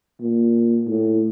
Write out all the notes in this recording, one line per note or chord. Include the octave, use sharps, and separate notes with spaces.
A#2
A2